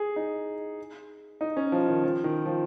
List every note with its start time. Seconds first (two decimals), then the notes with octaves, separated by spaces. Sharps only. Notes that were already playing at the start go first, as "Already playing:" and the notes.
Already playing: G#4
0.16 D#4
1.41 D#4
1.57 C#4
1.72 F3
1.88 D#3
2.03 F3
2.24 D#3
2.46 F3